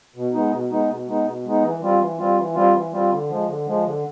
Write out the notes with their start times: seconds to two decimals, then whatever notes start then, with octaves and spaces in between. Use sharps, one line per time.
0.16 B2
0.33 G#3 B3 D#4
0.53 B2
0.71 G#3 B3 D#4
0.89 B2
1.07 G#3 B3 D#4
1.26 B2
1.45 G#3 B3 D#4
1.63 E3
1.82 G3 C4 F4
2.00 E3
2.18 G3 C4 F4
2.38 E3
2.55 G3 C4 F4
2.74 E3
2.92 G3 C4 F4
3.11 D3
3.29 F3 G#3
3.48 D3
3.67 F3 G#3
3.85 D3